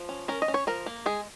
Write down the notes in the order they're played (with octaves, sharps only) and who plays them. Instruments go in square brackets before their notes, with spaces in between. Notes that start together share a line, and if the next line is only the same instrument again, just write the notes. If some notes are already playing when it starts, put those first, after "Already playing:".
Already playing: [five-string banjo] F3
C#4
C#4 A#4
D#5
C#4
C#5
F3 A#4
A#3
G#3 G#4